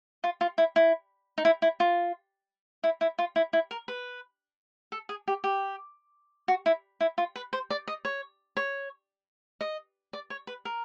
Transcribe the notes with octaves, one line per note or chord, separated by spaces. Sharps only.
F4
F4
E4
E4
D#4
E4
E4
F4
E4
E4
F4
E4
E4
A#4
B4
A4
G#4
G4
G4
F#4
E4
E4
F4
B4
C5
D5
D#5
C#5
C#5
D#5
D5
C#5
B4
A#4